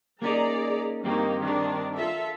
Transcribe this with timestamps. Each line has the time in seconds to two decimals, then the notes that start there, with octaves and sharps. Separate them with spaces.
0.22 A#3 C#4 D#4 G#4 D5 A#5
1.04 G2 D#3 A#3 C4 D#4 G4
1.40 D#3 D4
1.97 F4 A4 E5